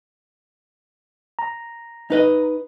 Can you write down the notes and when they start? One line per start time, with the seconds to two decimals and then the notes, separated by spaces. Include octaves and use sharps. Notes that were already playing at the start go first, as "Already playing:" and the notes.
1.39 A#5
2.10 D#4 B4 D#5